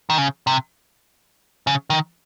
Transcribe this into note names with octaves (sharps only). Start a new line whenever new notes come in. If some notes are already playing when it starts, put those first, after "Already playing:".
D#3
C#3
C3
C#3
D#3